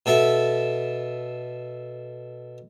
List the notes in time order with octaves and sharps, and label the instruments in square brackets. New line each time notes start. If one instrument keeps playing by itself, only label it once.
[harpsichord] B2 A4 E5